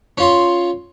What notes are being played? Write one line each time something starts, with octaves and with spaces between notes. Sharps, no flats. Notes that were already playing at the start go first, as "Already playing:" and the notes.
C#4 F4 C6